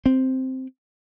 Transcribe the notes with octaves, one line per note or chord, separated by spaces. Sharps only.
C4